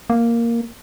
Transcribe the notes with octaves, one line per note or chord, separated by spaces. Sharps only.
A#3